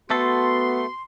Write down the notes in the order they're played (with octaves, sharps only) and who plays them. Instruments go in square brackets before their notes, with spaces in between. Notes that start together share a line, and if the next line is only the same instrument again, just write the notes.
[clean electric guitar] A3 A4 [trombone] B3 [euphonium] F#4 [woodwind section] C6